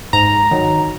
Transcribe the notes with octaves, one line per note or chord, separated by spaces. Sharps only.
G#2 A#5
D#3 F#3